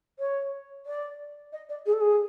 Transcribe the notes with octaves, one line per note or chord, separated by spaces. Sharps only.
C#5
D5
D#5
D5
G#4
A4
G#4